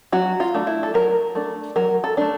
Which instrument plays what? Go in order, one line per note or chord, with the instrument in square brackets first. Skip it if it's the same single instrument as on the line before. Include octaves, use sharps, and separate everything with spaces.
[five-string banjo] F#3 F#4
F4
A3 D4
E4
A4
F#3 A#4
A3 D4
F#3 A#4
A4
A3 D4